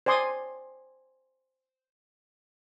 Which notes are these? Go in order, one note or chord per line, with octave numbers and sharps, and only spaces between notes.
C5 D5 G#5 C6 D#6